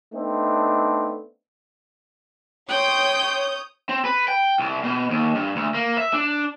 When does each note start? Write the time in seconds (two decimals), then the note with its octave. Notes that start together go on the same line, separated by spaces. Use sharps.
0.14 A3 B3 C4 D4 D#4
2.69 C#5 G5 C6 D#6 G6
3.89 C4
4.05 B4
4.28 G5
4.59 C2
4.84 B2
5.10 D#2
5.35 G2
5.56 D2
5.74 A#3
5.97 E5
6.13 D4